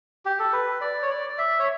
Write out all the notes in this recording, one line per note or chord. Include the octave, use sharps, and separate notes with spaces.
G4
A4
B4
D5
C#5
D5
D5
E5
C#5